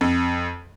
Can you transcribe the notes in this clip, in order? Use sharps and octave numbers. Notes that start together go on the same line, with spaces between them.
F2